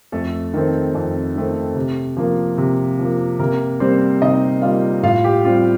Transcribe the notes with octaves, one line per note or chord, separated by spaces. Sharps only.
F2 A3 A4
D#3 A3 C4
F2
D#3 A3 C4
C3
F3 A#3
C3
F3 A#3
C3 A#3 A#4
G3 A#3 C4 C5
C3 D#4 D#5
G3 A#3 F4 F5
A2 F4 F5
G4
G3 C4 F4